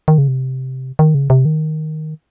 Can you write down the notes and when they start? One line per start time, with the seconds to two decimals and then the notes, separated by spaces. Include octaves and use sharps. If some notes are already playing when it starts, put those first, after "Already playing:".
0.08 D#3
0.18 C#3
0.28 C3
0.99 D#3
1.15 C#3
1.30 C3
1.45 D#3